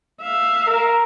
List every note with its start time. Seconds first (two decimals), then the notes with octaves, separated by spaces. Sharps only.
0.21 E5 F5
0.67 A#4